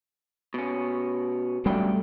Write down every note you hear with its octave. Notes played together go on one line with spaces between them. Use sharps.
B2 C#4
F#2 D3 G3 A3 G5